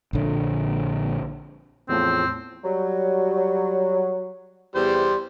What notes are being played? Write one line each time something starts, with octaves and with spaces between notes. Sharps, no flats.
A#1 D3
E2 A2 F3 C4
F#3 G3
E2 G3 C5